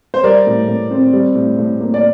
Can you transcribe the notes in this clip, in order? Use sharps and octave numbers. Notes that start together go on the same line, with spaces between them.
C5
G3 A#4 D5
A2
A2
C4
G3
A2
A2
A#3
D5